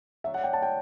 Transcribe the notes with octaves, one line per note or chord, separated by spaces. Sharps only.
D3 F#3 A3 D4 E5
F#5
G5
A5
G5